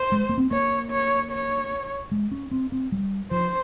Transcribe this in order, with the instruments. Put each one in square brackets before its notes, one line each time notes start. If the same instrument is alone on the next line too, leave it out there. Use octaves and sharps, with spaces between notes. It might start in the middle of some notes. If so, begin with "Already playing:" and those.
Already playing: [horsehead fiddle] C5
[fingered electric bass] G#3
A#3
C4
[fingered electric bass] A#3 [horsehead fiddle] C#5
[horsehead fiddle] C#5
C#5
[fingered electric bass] G#3
C#4
C4
C4
G3
[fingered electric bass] F3 [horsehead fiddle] C5